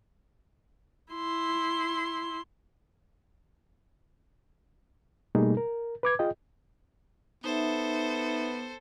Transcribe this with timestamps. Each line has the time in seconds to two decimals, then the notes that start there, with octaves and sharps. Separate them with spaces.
1.13 E4 C6
5.35 B2 G3 A3 A#3 D#4 G#4
5.57 A#4
6.03 B4 D6 G#6
6.19 F4 G#4 D#5 G5
7.44 B3 D#4 A4 C5 E5